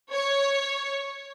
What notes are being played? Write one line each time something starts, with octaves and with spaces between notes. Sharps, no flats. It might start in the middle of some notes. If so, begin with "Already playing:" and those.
C#5